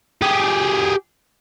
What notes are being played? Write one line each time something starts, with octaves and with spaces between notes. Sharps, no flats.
G4 G#4